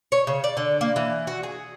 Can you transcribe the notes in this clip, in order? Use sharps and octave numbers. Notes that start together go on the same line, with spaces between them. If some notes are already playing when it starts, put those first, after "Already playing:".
C#5
C#3
D5
D3
A#3
E3
F#4
G#4